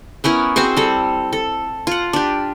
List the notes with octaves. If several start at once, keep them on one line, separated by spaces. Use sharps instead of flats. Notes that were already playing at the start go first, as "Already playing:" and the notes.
B3 C#4 E4 A#4
C4 F#4 G#4 C5
G3 A4
A4
F4 F#5
D4 G4